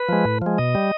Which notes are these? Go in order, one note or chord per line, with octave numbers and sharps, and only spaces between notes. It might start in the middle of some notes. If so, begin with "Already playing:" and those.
Already playing: B4
F3 G#3
A2
F3 G#3
B2 D#5
G3